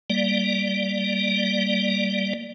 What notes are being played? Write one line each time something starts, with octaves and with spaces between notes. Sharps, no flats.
G3 A#3 D5